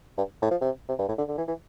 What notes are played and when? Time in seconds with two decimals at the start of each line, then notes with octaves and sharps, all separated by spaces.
0.18 G2
0.42 A2
0.51 F3
0.61 C3
0.89 C3
0.99 G2
1.08 A2
1.18 D3
1.28 D3
1.38 E3
1.48 E3